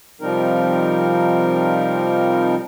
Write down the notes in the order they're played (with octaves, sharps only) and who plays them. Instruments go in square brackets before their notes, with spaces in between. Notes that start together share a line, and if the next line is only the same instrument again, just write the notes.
[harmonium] C3 F3 G3 C4 D#4 A#4